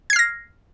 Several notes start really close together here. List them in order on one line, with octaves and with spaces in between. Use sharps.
G#6 C7 F6 A#6